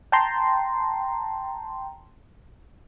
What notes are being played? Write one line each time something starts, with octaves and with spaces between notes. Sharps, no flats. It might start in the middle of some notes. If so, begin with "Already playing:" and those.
G5 A5 A#5 C6